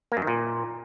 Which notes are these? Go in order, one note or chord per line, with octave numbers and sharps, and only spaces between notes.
A#3
F#2
D#3
A#2